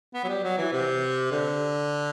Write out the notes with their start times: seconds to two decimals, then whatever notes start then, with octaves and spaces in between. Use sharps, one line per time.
0.14 B3
0.24 F#3
0.28 G3
0.44 F#3
0.58 E3
0.73 C3
1.31 D3